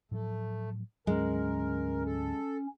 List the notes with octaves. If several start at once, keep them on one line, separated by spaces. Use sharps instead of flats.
A2 F3 F#3 A3
D2 G#2 F#3 G#3 C#4 A#4
A4